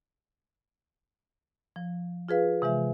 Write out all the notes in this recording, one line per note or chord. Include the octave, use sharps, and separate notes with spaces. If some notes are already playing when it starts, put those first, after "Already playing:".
F3
F4 G#4 B4 F5
C3 E3 G#3 E5